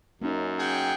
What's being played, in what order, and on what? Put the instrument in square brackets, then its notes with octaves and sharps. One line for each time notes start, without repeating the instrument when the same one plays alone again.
[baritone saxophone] F#2 [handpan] A#3 C#4 D#4
[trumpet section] G#4 F#5 G5